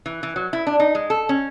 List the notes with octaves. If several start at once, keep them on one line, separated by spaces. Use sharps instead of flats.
E3
E3
F#3
E4
D4
D#4
G#3
A4
C#4